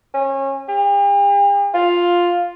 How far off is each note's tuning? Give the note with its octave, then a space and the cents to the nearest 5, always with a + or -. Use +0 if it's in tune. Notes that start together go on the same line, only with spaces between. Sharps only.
C#4 -30
G4 +45
F4 +5